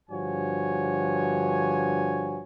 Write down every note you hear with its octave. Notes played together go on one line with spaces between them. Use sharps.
G2 D3 F3 F#4 C#5 G#5